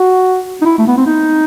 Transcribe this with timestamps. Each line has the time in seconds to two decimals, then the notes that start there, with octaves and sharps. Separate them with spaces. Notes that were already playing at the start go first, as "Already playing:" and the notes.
Already playing: F#4
0.61 D#4
0.65 E4
0.78 A3
0.87 B3
0.97 C4
1.06 D#4